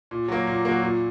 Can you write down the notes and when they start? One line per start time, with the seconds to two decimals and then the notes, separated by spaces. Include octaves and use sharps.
0.11 A#2
0.28 F#3 A#3
0.47 A#2
0.65 F#3 A#3
0.82 A#2